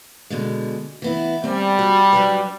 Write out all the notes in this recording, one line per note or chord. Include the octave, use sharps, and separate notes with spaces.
B2 D3 G#3
E3 B3 E4
G3 C4 G#5
F#4
F#3 D4 B4